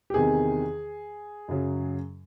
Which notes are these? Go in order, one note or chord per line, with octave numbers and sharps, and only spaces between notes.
G4
E2 C3 D#3 G#4
F#2 C#3 F#3